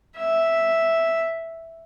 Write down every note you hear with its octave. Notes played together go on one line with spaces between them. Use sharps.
E5